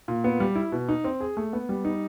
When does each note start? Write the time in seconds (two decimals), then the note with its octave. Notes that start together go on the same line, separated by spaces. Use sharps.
0.08 A#2
0.24 B3
0.40 G3
0.55 E4
0.72 B2
0.89 D#4
1.04 C4
1.20 G#4
1.37 A3
1.53 B3
1.69 G3
1.85 D#4